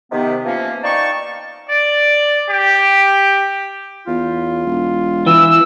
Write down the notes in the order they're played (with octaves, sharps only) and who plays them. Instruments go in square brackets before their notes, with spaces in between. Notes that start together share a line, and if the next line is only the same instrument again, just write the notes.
[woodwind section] C3 D#3 B3
E3 F3 A#3 C#4
D#4 D5 F5 G5 A5 C#6
[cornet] D5
G4
[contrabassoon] E2 [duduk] F4
[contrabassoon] E1
[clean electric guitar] E3 [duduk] E4 [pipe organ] E6